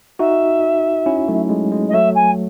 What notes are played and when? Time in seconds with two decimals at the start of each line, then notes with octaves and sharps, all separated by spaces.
0.19 D#4 F#4 E5
1.06 C#4 E4
1.28 F#3 A3
1.49 G#3
1.72 G#3
1.89 D#5
1.93 F#3 A3 E5
2.15 G#5